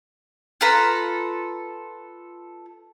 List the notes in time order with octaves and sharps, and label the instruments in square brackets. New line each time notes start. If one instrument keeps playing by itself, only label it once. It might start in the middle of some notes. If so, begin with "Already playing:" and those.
[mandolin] F4 A4 B4 A#5